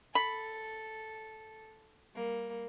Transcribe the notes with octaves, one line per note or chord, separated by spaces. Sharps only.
A4 B5
G3 A#3